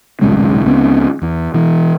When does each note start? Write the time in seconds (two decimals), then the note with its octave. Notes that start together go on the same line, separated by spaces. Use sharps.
0.21 D#1 B1 C#3 G#3
0.65 C#2 C#3 B3 C4
1.22 E2
1.54 B2 E3